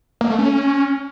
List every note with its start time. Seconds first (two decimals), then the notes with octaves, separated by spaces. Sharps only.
0.21 A#3
0.30 A3
0.39 C#4